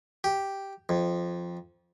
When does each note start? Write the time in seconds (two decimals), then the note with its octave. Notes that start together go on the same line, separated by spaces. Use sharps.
0.24 G4
0.89 F2